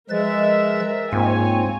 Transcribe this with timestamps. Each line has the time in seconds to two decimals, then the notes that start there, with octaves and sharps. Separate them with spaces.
0.10 F3 G#3 A#4 B4 E5 A6
1.13 G#2 A#3 C4 F4 C#5 G#5